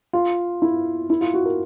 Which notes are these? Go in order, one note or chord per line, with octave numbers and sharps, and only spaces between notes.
F4
E4
E4
F4
F#4
A#4